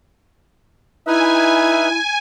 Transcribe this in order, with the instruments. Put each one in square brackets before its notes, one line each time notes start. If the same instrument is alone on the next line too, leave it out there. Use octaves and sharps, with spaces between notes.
[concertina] D#4 B4 [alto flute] E4 [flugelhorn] E5 [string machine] G#5